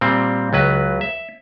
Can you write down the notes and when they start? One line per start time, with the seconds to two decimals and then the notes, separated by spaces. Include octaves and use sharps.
0.01 A#2 G3 C4
0.53 C#2 F#3 B4
1.01 E5